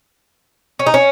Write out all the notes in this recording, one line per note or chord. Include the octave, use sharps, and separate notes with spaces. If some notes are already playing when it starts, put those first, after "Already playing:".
C#4
D#4
C#4